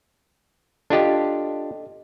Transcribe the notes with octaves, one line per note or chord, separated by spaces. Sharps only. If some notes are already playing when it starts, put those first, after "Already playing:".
D4 F4 G4 A4 D#5